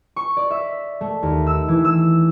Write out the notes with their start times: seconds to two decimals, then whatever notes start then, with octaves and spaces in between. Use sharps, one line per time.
0.16 C#6
0.37 D5
0.51 E5
1.01 A3
1.23 D#2
1.47 E6
1.68 E3
1.85 E6